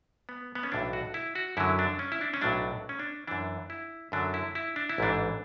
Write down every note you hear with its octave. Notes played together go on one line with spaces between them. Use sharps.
B3
B3
C#4
B1 A2 E3 D4
F#4
E4
F#4
F#2 D3 F#3 E4
D4
C#4
E4
D4
C#4
B1 A2 F#3 D4
C#4
D4
F#2 E3 D4
E4
F#2 D3 F#3 D4
E4
E4
D4
E4
A1 G#2 E3 D4